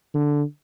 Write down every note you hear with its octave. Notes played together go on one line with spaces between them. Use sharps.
D3